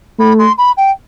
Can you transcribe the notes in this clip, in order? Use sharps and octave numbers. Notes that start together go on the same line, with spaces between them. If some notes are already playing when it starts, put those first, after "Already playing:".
A3 B5
C6
B5
G5